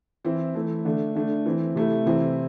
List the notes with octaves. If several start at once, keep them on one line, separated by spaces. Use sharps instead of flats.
E3 C4 E4
E3 A3 E4
D3 A3 D4
D3 A3 D4
E3 C4 E4
C3 A3 E4
C3 E3 C4 E4